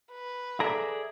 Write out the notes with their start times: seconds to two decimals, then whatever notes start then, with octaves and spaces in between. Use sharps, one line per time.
0.11 B4
0.60 G#4 A4 D5 E5 A#5